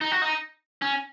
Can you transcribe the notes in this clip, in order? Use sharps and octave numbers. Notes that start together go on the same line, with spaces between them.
D#4
F#4
D#4
C#4